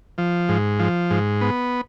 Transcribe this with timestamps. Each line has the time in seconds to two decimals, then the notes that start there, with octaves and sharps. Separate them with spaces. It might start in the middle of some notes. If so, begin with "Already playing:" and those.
0.18 F3
0.49 G#2
0.79 F3
1.10 G#2
1.41 B3